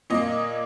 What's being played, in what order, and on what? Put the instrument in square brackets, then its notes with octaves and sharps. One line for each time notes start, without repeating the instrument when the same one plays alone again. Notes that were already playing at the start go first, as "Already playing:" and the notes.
[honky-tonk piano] A#2 A#3 D#5